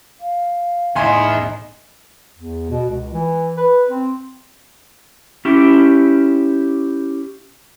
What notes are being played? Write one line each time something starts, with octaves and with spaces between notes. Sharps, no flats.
F5
E2 A2 D#4 E4 G#5 C6
E2
B2
C#2
E3
B4
C4
C#4 E4 G4